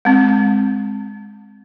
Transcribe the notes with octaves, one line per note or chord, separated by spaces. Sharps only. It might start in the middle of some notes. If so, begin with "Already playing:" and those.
G#3 C4